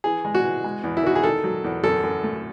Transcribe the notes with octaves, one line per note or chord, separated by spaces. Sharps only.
E3 G#4
G#3
F#4
E3
G#3
E2
E4
D#3 F#4
G#4
D#3 A4
F#3
E2
F#2 A4
F#2
A3